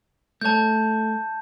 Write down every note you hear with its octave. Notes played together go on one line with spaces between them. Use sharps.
A3 C#5 A5 G6